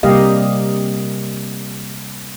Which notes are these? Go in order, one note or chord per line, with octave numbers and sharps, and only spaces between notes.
C3 G3 A#3 G4 D#5 F5